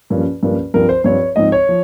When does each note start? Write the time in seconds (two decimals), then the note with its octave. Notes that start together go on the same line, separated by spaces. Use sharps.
0.10 G2 F3 A#3 C#4
0.43 G2 F3 A#3 C#4
0.74 G2 F3 C4 A#4
0.89 C5
1.04 G2 F3 C4 C#5
1.36 G#2 F3 C4 D#4 D#5
1.52 C#5
1.69 F3